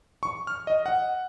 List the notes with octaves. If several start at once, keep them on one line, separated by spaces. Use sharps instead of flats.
C#6
F6
D#5
F#5